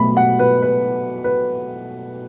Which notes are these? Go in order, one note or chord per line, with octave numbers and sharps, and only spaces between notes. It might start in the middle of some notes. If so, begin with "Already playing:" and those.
Already playing: B2 F#3 A3 B5
F#5
B4
B4
B4